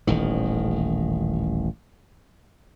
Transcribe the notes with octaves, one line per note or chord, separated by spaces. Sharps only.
D#1 A1 D#3